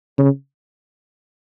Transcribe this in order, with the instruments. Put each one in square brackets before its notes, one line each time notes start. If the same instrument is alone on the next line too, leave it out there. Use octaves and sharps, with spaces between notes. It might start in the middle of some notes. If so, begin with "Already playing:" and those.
[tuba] C#3